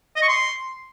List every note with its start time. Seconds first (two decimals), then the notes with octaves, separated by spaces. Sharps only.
0.16 D#5
0.22 C#6
0.28 C6